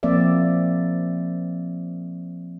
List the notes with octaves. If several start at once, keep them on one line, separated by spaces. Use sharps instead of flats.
F3 A#3 C4 D5 E5